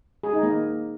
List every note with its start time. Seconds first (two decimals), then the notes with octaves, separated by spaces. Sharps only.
0.23 G#4
0.33 D#4
0.43 A#3